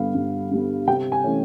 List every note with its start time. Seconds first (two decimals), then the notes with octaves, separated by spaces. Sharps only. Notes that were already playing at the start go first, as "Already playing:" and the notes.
Already playing: G2 D3 G3 B3 F5
0.15 G2
0.51 D3 G3 B3
0.87 C3 G5
1.12 G#5
1.24 E3 A3 C#4